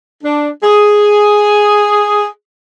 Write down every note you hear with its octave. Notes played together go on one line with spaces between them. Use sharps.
D4
G#4